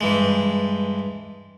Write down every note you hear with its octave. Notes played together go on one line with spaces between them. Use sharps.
G2 E3 G#3